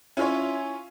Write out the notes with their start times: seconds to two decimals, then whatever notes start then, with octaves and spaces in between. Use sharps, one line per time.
0.17 C#4 E4 F4 C#5